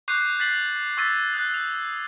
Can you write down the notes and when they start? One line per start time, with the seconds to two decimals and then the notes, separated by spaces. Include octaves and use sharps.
0.08 C#6 D6 F#6 G6 C7 D#7
0.39 F#6 G6 A6 B6 C7 F#7
0.97 C#6 E6 G#6 A6 B6 D#7
1.34 D#6 F#6
1.54 F7